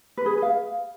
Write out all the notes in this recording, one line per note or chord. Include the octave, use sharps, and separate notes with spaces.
B4
G#4
B4
F5